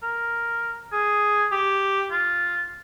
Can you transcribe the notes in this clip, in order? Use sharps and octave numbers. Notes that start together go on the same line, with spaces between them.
A#4
G#4
G4
F4